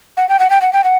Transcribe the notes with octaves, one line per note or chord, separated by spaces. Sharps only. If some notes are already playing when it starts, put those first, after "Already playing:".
F#5
G5
F#5
G5
F#5
G5
F#5